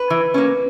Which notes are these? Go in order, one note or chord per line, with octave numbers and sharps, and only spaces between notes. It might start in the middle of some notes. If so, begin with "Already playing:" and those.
Already playing: B4
E3
A#3 C#4